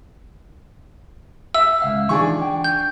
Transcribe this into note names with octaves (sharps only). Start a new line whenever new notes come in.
E5 E6
C#2 F5
E3 D4 D#4 F4 G#4 C#6
G5
G6